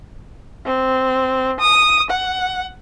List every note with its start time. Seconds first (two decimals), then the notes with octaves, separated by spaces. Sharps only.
0.66 C4
1.60 D#6
2.10 F#5